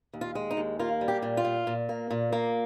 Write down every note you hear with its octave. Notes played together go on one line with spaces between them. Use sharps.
D#2
F4
G#3
D#4
D#2
A#3 F4
G3
G4
A#2
F4
A#2
A#2
A#3
A#2
A#3